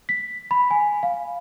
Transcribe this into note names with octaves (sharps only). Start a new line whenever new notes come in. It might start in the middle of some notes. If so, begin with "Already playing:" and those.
B6
B5
G#5
F5